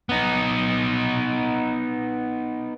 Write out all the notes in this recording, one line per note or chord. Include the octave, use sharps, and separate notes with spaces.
B3 D#4